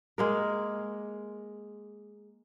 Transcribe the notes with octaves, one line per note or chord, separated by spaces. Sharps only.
G#3 A#3 A#4